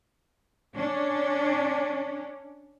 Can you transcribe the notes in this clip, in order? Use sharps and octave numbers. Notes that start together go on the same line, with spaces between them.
C#4 D4